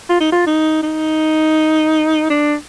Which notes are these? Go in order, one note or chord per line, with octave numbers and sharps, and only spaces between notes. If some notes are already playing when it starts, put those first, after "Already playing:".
F4
D#4
F4
D#4
D#4
D4